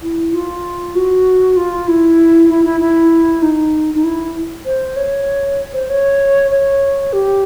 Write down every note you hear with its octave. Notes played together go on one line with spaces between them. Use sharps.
E4
F4
F#4
F4
E4
E4
E4
E4
D#4
D#4
E4
C5
C#5
C5
C#5
C#5
G4